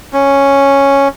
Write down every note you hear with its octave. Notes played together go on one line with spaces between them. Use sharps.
C#4